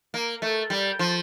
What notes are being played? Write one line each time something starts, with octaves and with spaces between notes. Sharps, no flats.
A#3
A3
G3
F3